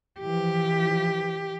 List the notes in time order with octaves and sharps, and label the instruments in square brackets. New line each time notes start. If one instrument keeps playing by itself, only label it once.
[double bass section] E3 F3 [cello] G4